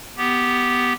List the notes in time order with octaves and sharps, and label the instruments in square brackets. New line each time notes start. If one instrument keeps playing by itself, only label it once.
[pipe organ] B3 G4